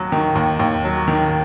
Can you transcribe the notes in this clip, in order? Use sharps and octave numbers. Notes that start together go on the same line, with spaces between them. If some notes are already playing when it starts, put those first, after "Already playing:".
Already playing: D#2 F#3
D#3
D#2
D#2
F#3
D#3